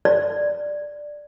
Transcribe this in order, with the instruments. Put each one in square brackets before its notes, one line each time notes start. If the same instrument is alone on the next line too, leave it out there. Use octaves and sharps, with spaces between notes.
[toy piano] D5